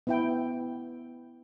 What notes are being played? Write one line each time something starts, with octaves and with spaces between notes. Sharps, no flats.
B3 E4 G5